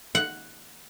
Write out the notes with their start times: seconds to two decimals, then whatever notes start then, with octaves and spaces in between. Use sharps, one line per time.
0.15 F#5